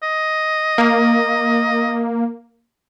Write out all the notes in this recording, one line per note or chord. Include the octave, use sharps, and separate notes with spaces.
D#5
A#3